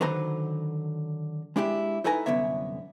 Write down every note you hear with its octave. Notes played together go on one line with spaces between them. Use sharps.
D3 D#3 F#3 B4 C5 A#5
G#3 D4 E4 G4
D#4 E4 A4 B4 G#5 A#5
C2 F#2 D3 B3 C#5 E5